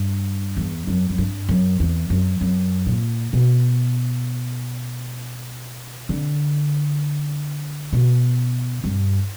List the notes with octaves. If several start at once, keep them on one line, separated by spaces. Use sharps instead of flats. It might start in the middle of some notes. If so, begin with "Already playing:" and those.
Already playing: G2
E2
F#2
F#2
G2
F#2
E2
F#2
F#2
A#2
B2
D3
B2
G2